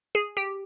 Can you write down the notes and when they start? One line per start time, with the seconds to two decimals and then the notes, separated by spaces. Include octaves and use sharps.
0.15 G#4
0.37 G4